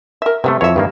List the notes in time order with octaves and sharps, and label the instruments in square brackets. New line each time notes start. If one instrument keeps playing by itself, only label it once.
[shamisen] A#4 E5
[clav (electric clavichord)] C3 A3 [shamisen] G3 B3
[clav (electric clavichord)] F2 C#5 [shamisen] E3 E5
[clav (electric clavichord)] G2 D#3 A#3